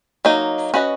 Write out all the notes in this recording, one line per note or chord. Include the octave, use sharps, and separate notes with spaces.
F#3 A#3 D#4
C#4 F#4 B4 D#5